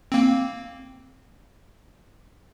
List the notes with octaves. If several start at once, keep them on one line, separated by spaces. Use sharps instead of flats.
A#3 C4